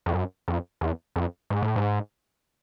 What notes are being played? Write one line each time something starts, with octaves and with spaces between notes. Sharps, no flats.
F2
F#2
F2
E2
F2
G#2
A2
G#2